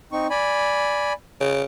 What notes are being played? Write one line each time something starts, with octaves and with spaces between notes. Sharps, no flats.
C4 D#4 C#6
D5 G#5 B5
C#3